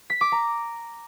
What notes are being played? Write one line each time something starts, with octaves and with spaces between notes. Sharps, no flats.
B6
D6
A#5